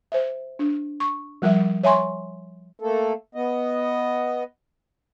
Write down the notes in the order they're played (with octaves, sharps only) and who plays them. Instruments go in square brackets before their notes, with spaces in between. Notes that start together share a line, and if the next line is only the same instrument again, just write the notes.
[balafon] C5 E5
D4
C#6
F3 G3 A#4 E5
C#5 E5 G#5 C6 C#6
[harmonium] A3 A#3 A4
B3 D#5